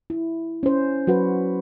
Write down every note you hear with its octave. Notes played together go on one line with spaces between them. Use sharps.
E4
C#4 C5
F#3 F#4 B4 F#5